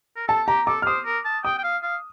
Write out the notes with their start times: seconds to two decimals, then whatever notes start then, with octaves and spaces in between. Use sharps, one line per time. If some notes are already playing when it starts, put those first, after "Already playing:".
0.16 A#4
0.28 A4 A5
0.48 G4 A#5
0.67 A4 D6
0.82 F6
0.86 C5 D#6
1.05 A#4
1.25 A5
1.44 G5 D#6
1.59 G5
1.64 F5
1.83 F5